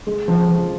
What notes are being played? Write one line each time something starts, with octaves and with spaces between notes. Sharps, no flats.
G#3
F3
F3